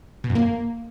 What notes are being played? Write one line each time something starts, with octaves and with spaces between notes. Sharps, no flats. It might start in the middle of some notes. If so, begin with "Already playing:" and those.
B2
F#2
A#3